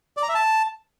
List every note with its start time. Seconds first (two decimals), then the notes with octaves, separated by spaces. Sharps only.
0.17 D5
0.23 A#5
0.29 E5
0.35 A5